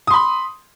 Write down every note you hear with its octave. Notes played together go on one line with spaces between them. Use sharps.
B5 C6 D#6